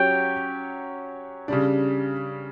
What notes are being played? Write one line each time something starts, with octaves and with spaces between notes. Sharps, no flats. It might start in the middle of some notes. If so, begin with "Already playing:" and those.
Already playing: F#3 C#4 G4 C#5 G5
C#3 G3 D4